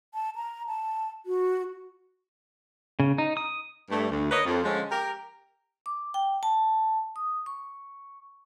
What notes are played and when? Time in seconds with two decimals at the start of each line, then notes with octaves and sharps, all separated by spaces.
0.14 A5
0.36 A#5
0.67 A5
1.26 F#4
3.00 C#3
3.18 D#4
3.37 D#6
3.91 G2 A3
4.10 D2
4.31 A#4 B4 C#5 D#5
4.46 F2
4.64 D3 F3 G#3 C#4
4.91 G4 A#4
5.86 D6
6.14 G5
6.43 A5
7.16 D#6
7.46 C#6